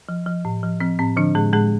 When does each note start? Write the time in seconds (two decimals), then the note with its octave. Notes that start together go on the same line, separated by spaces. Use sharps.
0.09 F3
0.26 F3
0.45 A2
0.63 F3
0.81 F3 C4
0.99 A2 C4
1.17 D3 F3 D4
1.35 A2 G#3 G#4
1.53 A2 G#3 G#4